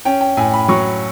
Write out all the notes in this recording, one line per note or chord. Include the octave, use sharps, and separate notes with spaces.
C#4 G5
G5
A2 G#5
B5
F#3 C#6